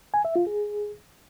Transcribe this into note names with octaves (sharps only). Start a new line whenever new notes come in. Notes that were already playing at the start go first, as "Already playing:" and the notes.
G#5
E5
F4
G#4